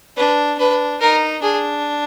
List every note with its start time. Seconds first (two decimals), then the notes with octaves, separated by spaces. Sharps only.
0.17 D4 B4
0.58 D4 B4
1.01 D#4 A#4
1.43 D4 G#4